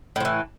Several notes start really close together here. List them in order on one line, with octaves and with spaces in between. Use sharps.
A2 F3 E3